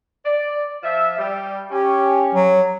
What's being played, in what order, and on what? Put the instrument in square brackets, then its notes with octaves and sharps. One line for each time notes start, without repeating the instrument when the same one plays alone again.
[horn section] D5
F3 E5
G3
[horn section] C#4 [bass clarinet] G4
[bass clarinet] F#3